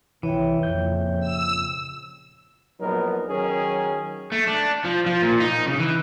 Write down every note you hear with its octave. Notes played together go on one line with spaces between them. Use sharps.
C2 B2 E3 C#5 E5 G5
F2 A#2 C#3 G6
E6
A#1 F#3 B3 D#4 A#4
D#3 F#3 C#4 G#4 A#4
A3
D4
F3
F3
A#2
D#4
C#3
E3